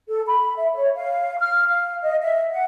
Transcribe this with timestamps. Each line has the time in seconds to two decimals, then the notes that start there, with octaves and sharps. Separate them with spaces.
0.09 A4
0.26 B5
0.56 E5
0.74 C#5
0.95 F5
1.39 F6
1.68 F5
2.02 D#5
2.22 E5
2.52 F#5